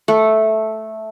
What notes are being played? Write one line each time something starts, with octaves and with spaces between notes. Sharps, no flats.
A3